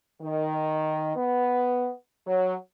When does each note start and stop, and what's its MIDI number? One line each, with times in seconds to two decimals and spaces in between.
0.22 1.12 51
1.16 1.90 59
2.27 2.54 54